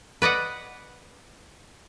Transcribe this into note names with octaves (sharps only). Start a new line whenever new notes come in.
B4 D5 D#5 F#5